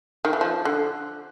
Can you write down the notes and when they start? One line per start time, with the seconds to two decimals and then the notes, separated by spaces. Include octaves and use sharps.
0.25 D#3
0.33 E3
0.41 F3
0.65 D3